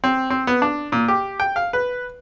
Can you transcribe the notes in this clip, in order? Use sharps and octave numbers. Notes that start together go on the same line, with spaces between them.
C4
C4
B3
D4
A#2
G4
G5
F5
B4